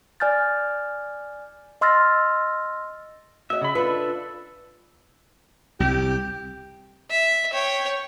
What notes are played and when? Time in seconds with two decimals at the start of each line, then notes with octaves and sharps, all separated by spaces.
0.20 D5 G#5 F6 G6 A6
1.81 D#5 C6 E6 F6 A6 A#6
3.50 F#4 D#5 E5
3.62 C#3 B5
3.75 D4 F4 A4 B4 E5
5.80 C2 G4
7.10 E5
7.53 C#5 G5